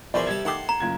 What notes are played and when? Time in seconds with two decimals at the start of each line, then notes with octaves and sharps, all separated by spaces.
0.14 B2 E3 F3 G#4 A#4 C5 D5
0.27 C3 G3 A5 G#6
0.45 D#3 A3 G4 F#5 A5 C6
0.69 A#5
0.80 F#1 F4 G#6